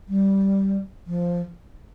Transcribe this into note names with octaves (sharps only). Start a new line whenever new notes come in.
G3
F3